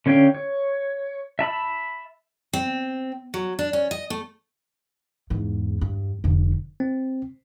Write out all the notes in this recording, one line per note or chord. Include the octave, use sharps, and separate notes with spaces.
D3 C#4 C#5 F5 G5
C#5
E5 A5 B5 E6
C4
F#3
D4
C#4
D#5
A3
E2 G#2
G2
F1 D3
C4